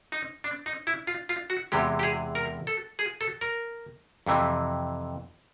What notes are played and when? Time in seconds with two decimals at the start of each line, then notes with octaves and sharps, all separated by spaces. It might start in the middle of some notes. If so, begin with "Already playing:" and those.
0.12 D#4
0.44 D4
0.66 D#4
0.87 E4
1.07 F4
1.29 F4
1.50 F#4
1.72 E2 C3 E3 G#3 G4
1.99 G4
2.03 G#4
2.35 A#4
2.67 A4
2.99 G#4
3.21 A4
3.41 A#4
4.26 F2 C3 E3